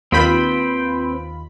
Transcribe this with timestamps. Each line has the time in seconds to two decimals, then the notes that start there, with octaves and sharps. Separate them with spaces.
0.12 D#2 C4 F4 B4 G5 B5